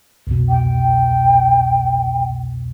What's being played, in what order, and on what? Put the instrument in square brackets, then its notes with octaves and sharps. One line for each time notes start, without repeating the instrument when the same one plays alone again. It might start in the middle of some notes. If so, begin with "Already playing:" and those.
[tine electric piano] C2 F2 B2
[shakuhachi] G5